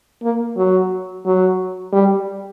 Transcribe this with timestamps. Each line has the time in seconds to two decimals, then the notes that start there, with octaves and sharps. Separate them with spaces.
0.23 A#3
0.57 F#3
1.25 F#3
1.93 G3